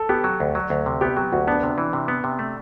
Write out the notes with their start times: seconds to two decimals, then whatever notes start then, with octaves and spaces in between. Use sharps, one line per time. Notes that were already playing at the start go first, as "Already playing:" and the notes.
Already playing: A4
0.09 B3 G4
0.24 F#3
0.40 D2
0.55 F#3
0.70 D2
0.86 C3
1.01 B3 G4
1.17 F#3 G4
1.32 D2 F#4
1.47 B3 D4
1.63 C3
1.78 E3
1.93 C3
2.08 B3
2.24 C3
2.39 A3